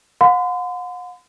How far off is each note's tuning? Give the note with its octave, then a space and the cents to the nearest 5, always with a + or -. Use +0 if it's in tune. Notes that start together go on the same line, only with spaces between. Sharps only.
F#5 -45 C6 -45